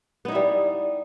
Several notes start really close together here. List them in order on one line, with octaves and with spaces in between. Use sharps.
B3 D#4 E4 G3